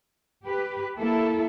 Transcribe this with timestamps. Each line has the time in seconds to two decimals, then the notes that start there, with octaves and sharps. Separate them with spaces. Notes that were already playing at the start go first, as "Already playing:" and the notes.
0.45 G4 B4
0.98 A#3 E4 A4